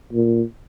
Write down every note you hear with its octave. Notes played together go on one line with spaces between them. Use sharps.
A#2